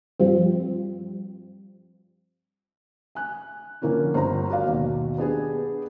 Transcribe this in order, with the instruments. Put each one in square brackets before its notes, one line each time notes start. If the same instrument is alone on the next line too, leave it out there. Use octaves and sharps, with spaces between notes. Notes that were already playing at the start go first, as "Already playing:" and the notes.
[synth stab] G2 F3 G3 C4
[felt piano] G#5 F#6
D3 F3 A#3 C#4 E4
G1 C5 A#5
F#4 D5 F5
D#2 B2
B3 D4 G4 G#4 B4